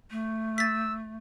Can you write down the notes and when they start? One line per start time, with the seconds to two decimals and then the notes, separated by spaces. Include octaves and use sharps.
0.11 A3
0.58 E6 A6 B6